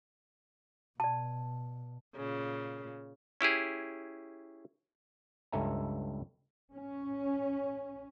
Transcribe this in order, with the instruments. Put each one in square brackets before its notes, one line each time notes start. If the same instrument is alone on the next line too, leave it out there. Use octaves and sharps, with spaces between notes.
[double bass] B2 [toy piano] D5 A5
[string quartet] A#2 C#3
[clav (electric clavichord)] C#4 E4 G4 G#4
C#2 G2 A4 E5 G#5 A#5
[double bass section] C#4